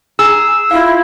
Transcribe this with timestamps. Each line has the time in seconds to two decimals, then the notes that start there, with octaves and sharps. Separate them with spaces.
0.19 G#4 A#5 E6
0.71 E4 F4 F5